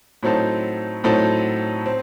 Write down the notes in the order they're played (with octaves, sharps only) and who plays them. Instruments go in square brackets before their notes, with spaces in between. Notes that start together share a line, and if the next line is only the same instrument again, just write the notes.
[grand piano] A2 F#3 C4 D#4 A4
A2 F#3 C4 D#4 A4
C4